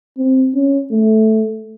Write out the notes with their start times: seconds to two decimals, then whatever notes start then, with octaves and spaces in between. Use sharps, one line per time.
0.18 C4
0.55 C#4
0.91 A3